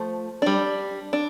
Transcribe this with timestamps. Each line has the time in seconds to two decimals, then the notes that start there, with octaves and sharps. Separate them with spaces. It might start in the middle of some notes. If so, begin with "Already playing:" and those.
Already playing: F3 A3 C5
0.42 G3 D4
1.13 D4